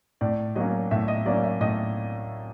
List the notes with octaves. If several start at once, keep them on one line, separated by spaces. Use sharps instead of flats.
A2 D5
F#3 A#3 C#4 D#5
A2 E5
D#5
F#3 A#3 C#4 D5
E5
A2 D#5